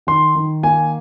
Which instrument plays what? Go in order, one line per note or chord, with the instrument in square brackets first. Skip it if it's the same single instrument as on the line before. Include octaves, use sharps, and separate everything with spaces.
[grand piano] D#3 C6
D#3
A#3 G#5